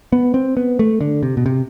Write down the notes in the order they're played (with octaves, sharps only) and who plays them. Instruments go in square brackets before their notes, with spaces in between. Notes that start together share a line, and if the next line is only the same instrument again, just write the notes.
[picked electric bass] B3
C4
B3
A3
D3
C3
B2
C3